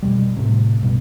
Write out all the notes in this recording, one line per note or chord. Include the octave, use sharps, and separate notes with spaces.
F1 C2 B2 G3
A2 C3
B1 G2 B2